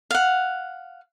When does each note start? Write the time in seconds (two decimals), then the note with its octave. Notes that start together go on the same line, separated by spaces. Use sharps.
0.11 F5 F#5